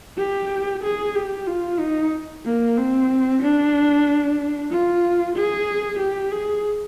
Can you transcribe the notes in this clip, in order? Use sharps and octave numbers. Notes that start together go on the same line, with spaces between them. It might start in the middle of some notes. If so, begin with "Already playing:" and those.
G4
G#4
G4
F4
D#4
A#3
C4
D4
F4
G#4
G4
G#4